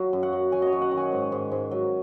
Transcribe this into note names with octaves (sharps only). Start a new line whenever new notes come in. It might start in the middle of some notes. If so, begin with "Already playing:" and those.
Already playing: F#3
F#2
F#5
F#3
F#3 G#5
C#5 D#5
F#3
F#5
D#3
G#5
G#2
G#2
G#2
F#3